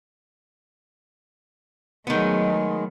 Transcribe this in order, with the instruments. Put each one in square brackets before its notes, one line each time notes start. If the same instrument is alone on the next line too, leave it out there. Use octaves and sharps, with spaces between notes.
[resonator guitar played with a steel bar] D#3 B3 [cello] F#3 A3 [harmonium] G#3